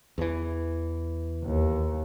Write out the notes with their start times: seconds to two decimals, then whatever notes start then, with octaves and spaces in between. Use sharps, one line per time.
0.18 E2 E3
1.44 D#2